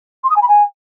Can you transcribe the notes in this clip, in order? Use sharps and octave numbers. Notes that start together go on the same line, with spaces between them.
C6
D#6
G#5
B5
G#5